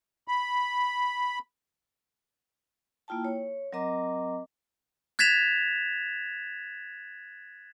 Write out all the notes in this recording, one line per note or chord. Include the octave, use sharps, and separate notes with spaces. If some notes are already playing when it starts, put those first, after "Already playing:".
B5
A#3 E4 F4 G5 A5
C#5
F#3 C4 A#4 D#5 A#5 D6
F#6 G#6 A6 B6 E7 F7